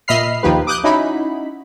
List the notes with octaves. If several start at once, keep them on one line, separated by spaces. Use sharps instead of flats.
A#2 D#5 E5 B5 F6 C7
D#2 D#3 F3 A#3 G4 B4
D6 D#6 F#6 G6
C#4 D#4 E4 F#4 B5